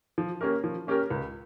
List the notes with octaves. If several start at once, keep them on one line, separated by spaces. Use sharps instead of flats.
F3
A#3 C#4 G4 A#4
F3
A#3 C#4 G4 A#4
C#2